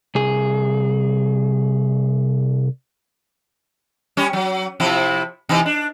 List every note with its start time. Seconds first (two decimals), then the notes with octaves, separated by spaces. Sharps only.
0.15 C2 G#4
4.17 G3 C#4 C#5
4.33 F#3
4.80 C3 F3 E4
5.49 C3 E3 D#4
5.66 D4